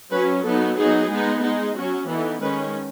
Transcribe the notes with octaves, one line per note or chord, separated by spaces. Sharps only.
F#3 C#4 B4
F#3 B3 D#4 A4
F#3 B3 D#4 G#4
G#3 B3 D#4
G#3 D#4
F#3 C#4 F#4
E3 B3 D#4 A4
D#3 G#3 C#4 B4